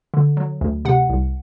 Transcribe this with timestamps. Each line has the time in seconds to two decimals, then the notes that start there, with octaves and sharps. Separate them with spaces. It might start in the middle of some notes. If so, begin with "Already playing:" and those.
0.14 D3
0.37 F#3
0.61 D2
0.85 C3 F#5
1.09 C2